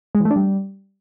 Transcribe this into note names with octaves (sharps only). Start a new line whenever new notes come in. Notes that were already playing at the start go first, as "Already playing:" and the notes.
G#3
E3
A3
D4
G3